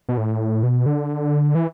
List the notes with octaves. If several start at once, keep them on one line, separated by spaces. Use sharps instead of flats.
B2
A2
B2
D3
E3